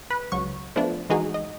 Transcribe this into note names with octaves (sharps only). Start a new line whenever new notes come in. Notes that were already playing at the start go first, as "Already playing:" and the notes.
B4
C#2 F#3 C#6
F3 A3 B3 D4
E3 G#3 D#4 F#4 G#4
D#5